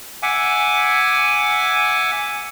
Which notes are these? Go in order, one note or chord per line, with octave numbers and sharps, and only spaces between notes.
E5 F#5 G#5 D6